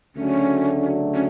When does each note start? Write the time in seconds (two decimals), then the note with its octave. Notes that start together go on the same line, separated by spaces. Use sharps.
0.16 D2 C#3 F#3 A3 C#4 D4
1.14 C#4